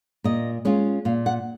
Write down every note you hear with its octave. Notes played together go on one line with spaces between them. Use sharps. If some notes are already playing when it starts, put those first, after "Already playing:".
A#2 D#5
G#3 C#4 F4
A#2 F5
F#5